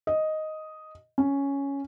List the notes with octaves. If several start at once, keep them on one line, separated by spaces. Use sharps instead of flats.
D#5
C#4